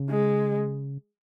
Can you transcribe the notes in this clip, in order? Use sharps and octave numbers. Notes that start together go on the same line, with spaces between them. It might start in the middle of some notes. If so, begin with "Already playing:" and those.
Already playing: C#3
G#3